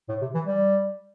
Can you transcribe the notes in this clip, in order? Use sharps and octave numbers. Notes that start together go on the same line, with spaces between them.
A2
C3
E3
G3